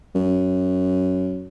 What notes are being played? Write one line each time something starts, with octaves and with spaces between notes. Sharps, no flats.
F#2